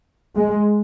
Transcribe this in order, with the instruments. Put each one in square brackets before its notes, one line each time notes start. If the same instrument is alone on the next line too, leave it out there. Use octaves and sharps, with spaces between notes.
[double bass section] G#3